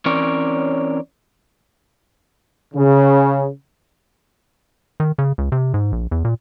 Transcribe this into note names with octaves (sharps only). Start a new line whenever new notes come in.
E3 C4 C#4 A#4 C#5 D5
C#3
D#3
C#3
C#2
C3
G#2
A#1
E2
A#2